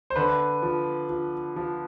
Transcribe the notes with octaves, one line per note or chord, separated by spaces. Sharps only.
C5
D3 B4
F3
F3
F3